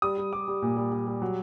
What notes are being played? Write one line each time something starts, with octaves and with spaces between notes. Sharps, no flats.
G3 D#6
G3
G3 D6
G3
A#2
G3
G3
G3
F#3